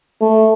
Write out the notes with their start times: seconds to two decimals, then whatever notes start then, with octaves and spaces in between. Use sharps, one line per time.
0.21 A3